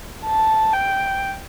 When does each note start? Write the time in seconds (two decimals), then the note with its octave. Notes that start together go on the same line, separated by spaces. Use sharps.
0.25 A5
0.73 G5